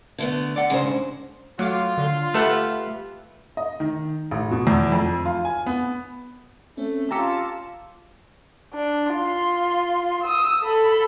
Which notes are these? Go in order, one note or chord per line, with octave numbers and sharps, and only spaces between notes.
D3 A3 B3
D5 F#5
G#2 C#3 G#3 D4 C5
F#3 A3 F4 D6
D3 C6
A3 G4 A4 B4 E5 F#5
D#5
D#3
A1
B2
E2
F2
F4
G#5
B3
A3 C4 C#4
C#4 F4 G4 A5 A#5 E6 C#7
D4
F4 C6
D#6 E6
A4 B5